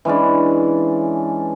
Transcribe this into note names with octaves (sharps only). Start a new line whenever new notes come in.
E3 G#3 C#4 D4